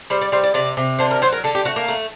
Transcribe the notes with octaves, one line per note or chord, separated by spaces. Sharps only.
G3 C5
D5
G3 C5
D5
C3 D5
C3
D3 C5
A#4
F#3 C5
A#4
D3 A4
G4
A3 F#4
A#3
A3